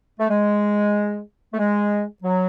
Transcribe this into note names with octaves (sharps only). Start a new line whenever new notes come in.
A3
G#3
A3
G#3
F#3